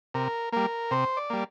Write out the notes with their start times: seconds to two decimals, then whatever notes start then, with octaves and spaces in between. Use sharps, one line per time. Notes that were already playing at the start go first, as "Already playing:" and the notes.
0.14 C3 A#4
0.52 G3 A#3 A#4
0.91 C3 C5
1.17 D5
1.30 G3 A#3